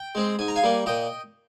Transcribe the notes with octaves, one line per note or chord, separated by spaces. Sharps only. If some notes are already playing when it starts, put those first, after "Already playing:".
Already playing: G5
G#3 C4
G#2 G#5
A#5
F5 G#5
G3 A#3
A#2 D#5 G5